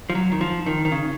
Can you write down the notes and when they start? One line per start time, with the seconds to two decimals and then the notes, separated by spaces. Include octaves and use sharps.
0.10 F3
0.15 F#3
0.32 D#3
0.41 F3
0.66 D#3
0.85 D#3
0.92 C#3